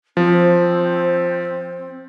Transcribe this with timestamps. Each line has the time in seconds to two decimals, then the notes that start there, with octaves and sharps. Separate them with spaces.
0.17 F3 C4